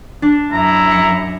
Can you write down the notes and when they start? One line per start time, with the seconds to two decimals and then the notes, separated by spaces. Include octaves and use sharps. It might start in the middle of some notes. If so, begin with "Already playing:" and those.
0.22 D4
0.52 F#2 E4 A#5
0.92 C#7